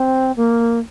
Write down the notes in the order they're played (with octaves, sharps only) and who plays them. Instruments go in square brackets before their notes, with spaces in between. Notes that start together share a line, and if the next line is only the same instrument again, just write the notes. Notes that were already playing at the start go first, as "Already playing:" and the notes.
Already playing: [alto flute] C4
A#3